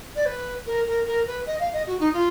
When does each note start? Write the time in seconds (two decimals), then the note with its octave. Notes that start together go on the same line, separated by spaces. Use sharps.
0.16 D5
0.26 B4
0.66 A#4
0.86 A#4
1.06 A#4
1.27 B4
1.46 D#5
1.60 F5
1.73 D#5
1.87 F#4
2.00 D#4
2.13 F4